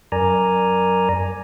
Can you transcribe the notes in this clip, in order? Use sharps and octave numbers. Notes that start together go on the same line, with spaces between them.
F#2 A#4 D5 G#5 A#5